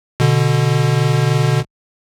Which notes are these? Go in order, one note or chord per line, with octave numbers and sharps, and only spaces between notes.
B2 D3